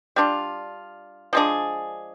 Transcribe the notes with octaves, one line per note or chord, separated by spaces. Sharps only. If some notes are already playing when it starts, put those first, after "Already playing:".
G3 D4 F4
F3 G#3 D4 G#4